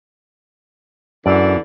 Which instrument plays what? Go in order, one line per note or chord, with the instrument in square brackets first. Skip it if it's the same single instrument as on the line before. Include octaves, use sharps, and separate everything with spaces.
[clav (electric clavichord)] F#2 [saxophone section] D3 E3 D5